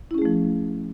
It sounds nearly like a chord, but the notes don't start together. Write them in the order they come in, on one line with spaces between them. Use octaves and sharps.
E4 C#4 G#4 A3 F3